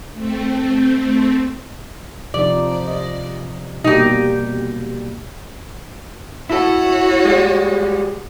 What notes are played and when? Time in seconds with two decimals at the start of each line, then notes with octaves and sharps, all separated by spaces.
0.13 A3 C4
2.34 C3 F3 D#4 D5
2.88 D#5
3.84 B2 G3 A#3 D#4 G4
6.50 E4 F#4 A4 C#5
7.25 G3 G#3